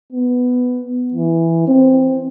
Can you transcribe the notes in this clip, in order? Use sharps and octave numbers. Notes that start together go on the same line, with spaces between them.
B3
E3
C4